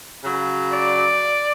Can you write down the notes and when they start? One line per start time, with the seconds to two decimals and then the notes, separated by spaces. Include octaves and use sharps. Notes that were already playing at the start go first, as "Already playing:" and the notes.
0.22 C#3 F#3
0.73 D5